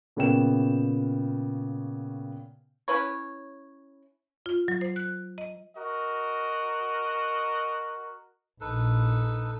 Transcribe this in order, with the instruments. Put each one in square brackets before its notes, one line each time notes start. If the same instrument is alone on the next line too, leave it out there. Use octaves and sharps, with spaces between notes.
[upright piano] A#2 C#3 B3 C#5 G5 E7
[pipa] C#4 E4 B4 C#5
[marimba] F4
F#3
C5
F#6
D#5
[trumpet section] F#4 A#4 D#5
[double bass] A#1 [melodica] D#4 A4 B4